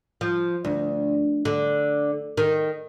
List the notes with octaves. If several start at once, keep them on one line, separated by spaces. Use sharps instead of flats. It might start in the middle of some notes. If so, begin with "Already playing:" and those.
F3
D2
D3
D#3